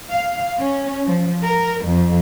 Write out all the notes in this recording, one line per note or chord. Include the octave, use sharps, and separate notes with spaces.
F5
C#4
F3
A#4
F2